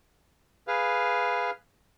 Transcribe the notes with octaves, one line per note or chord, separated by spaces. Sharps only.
G#4 B4 F5